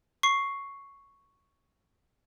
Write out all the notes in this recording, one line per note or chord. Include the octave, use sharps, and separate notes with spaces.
C#6 C7